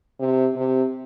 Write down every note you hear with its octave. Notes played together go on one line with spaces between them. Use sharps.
C3
C3